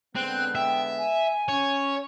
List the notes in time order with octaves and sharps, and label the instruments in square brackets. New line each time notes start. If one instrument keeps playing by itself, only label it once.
[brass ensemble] D3 G#3 B3 [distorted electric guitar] C4 [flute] F#6
[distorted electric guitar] E5 [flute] G5
[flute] G#5
[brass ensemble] C#4 [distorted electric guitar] C#5